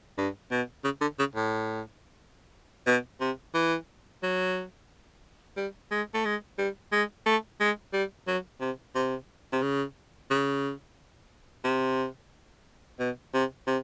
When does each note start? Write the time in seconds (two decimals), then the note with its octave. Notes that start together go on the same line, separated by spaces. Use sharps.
0.18 G2
0.51 B2
0.84 C#3
1.01 D3
1.19 C#3
1.36 A2
2.87 B2
3.21 C3
3.54 E3
4.23 F#3
5.57 G3
5.91 G#3
6.14 A3
6.25 G#3
6.58 G3
6.92 G#3
7.26 A3
7.60 G#3
7.93 G3
8.27 F#3
8.61 C3
8.95 C3
9.53 C3
9.62 C#3
10.31 C#3
11.65 C3
13.00 B2
13.34 C3
13.67 C3